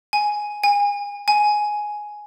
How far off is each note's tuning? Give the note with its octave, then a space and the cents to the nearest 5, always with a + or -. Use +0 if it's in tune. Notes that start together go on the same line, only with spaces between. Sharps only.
G#5 +5
G#5 -30
G#5 +10